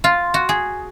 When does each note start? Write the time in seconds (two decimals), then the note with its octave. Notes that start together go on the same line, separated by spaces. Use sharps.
0.04 F4
0.34 F#4
0.49 G#4